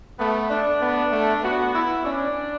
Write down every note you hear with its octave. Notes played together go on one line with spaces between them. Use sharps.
A3 B3
D4
B3
A3
B3 F#4
E4
C#4 D4